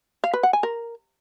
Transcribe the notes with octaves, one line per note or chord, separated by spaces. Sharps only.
F5
B4
F#5
G#5
A#4